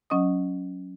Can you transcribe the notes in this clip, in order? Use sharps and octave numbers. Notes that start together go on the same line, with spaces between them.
F#3 C#4 D#5 D#6